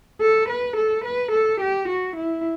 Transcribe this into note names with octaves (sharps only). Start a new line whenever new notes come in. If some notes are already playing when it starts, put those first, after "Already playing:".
A4
B4
A4
B4
A4
G4
F#4
E4